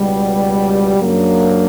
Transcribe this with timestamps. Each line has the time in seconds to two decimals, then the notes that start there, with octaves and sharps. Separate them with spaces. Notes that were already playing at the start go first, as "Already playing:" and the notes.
Already playing: C#2 B2 G3
0.99 F#2 C#3 F#3 A#3 D4